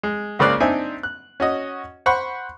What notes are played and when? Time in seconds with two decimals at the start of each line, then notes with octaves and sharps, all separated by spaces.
0.03 G#3
0.39 C#2 C#3 A#3 C5 D5 F#6
0.60 C4 D4 D#4 E5 G#5
1.03 F#6
1.40 C#4 F#4 D#5
2.06 C5 F#5 B5 C#6